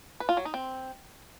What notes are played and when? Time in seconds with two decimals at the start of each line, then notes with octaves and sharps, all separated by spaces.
0.20 B4
0.29 F4
0.37 F#3
0.45 D#4
0.54 C4